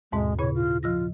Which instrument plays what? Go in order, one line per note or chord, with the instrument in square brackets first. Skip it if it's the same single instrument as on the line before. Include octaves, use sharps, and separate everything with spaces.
[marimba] D#2 G#2 B2 [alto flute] G#3
[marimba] A#2 C#3 E4 [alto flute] C#5
[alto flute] F4
[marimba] F3 E6 A#6 [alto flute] F4